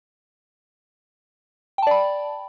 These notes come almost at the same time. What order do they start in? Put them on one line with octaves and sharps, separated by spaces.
G5 A5 D5 B5